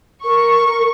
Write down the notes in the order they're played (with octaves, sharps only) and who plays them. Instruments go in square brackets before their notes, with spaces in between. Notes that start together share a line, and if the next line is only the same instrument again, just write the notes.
[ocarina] A#4 [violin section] C#6